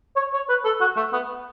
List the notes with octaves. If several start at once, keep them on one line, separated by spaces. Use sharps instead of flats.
C#5
C#5
B4
A4
F#4
A3
B3